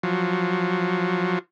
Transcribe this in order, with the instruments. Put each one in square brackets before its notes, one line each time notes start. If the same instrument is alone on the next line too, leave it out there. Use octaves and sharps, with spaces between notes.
[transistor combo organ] F3 F#3